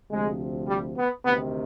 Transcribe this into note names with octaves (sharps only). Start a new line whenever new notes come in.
D2 C3 F3 G#3
G3
B3
D2 C3 D#3 B3